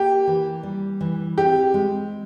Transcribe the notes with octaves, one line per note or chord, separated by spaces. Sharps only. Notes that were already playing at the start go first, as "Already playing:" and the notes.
Already playing: A#3 G4
E3
G3
E3
C4 G4
G#3